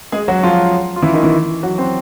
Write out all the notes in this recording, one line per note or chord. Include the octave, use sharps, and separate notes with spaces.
G#3 G#4
F#3 F#4
F3 F4
F4
E3 E4
D#3 D#4
E3 E4
F#3 F#4
C4 C5